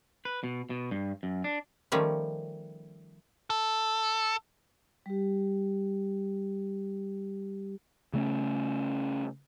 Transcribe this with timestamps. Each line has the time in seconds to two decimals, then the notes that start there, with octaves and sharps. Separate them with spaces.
0.25 B4
0.44 B2
0.70 B2
0.91 G2
1.23 F#2
1.44 D4
1.92 D#3 F3 G3 A3 C#4
3.50 A4
5.06 G3 G4
8.13 C#3 A3 C4 C#4